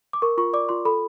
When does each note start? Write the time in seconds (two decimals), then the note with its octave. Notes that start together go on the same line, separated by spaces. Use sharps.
0.13 D6
0.22 A#4 C#6
0.38 F4 C#6
0.53 D5 D6
0.69 F4 C6
0.85 A4 B5